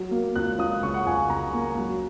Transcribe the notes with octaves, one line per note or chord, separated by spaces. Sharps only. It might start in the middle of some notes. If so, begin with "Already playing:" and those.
Already playing: F#3
A#3
C#2 F#6
C#2 D#6
C#3 C#6
F#5
C#2 G#5
C#3 A#5
A#3
F#3